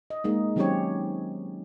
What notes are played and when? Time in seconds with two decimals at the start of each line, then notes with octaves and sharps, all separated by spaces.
0.10 D#5
0.24 G#3 A#3 D#4
0.56 D#3 F#3 C4 C#4 G4 C#5